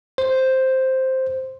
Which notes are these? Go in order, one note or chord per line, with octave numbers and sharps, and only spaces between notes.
C5